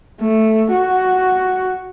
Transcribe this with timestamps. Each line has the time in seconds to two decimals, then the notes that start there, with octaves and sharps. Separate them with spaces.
0.21 A3
0.73 F#4